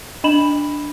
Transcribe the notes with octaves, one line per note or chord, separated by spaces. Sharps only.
D4 D#5 B5 E7 F#7